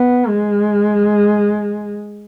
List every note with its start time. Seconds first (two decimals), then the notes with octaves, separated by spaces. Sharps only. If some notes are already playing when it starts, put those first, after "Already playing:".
Already playing: B3
0.28 G#3